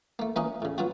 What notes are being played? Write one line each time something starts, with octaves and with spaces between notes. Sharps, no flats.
A3 A#3
E3 A#3 C#4 D#4 A#4 D#5
A2 C#3
F#3 B3 F4 F#4